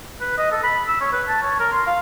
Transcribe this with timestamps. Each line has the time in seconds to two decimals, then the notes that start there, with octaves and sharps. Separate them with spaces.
0.21 B4
0.38 D#5
0.52 A4
0.64 B5
0.88 E6
1.01 C#5
1.13 B4
1.28 A5
1.42 C#5
1.60 A#4
1.72 C6
1.87 F5